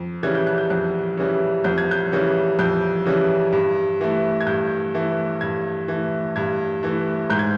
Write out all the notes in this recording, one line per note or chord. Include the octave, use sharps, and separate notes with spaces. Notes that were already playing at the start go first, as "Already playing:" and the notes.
Already playing: F2
C#3 E3 G3 G#6
G6
F#6
G6
F2 F#6
C#3 E3 G3
F2 G6
G#6
G6
C#3 E3 G3
F2 G6
C#3 E3 G3
G2
E3 A3
G#6
G2 G6
E3 A3
G2 G#6
E3 A3
G2 G#6
E3 A3
G#2 G6
G#6